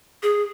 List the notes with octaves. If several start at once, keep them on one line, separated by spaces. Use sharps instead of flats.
G#4